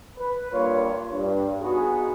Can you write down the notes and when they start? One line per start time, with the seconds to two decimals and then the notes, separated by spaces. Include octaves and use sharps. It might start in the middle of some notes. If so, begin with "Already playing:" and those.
0.17 B4
0.53 G2 A#3 F4 C#5
1.10 G2
1.61 B3 D#4 F#4 G#4